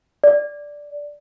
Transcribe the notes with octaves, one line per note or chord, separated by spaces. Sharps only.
D5